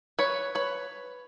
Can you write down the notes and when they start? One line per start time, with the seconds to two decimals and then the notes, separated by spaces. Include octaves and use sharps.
0.19 B4 C#5
0.55 B4 C#5